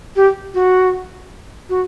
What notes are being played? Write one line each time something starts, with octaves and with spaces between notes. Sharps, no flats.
G4
F#4
F#4